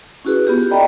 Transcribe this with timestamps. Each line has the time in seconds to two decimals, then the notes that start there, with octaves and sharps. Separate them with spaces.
0.25 C#4 E4 F#4 G#4 B4
0.47 B3 F4 G4
0.71 A4 D5 D#5 G5 A#5 B5